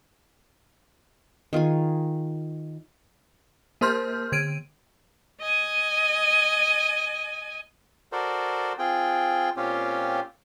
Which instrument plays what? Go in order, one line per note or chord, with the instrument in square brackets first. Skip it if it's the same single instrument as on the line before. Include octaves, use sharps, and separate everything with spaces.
[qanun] D#3 F4 G#4 G#5
[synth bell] A#3 A#4 C5 C6 F6 G6
D3 G#6 D7 D#7
[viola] D#5 G#5
[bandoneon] F#4 A4 A#4 C5 D5
C4 F4 G#4 G5
A#2 C4 C#4 F4 G4